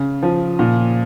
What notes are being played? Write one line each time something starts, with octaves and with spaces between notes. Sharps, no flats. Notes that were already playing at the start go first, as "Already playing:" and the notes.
Already playing: C#3
F3
A#2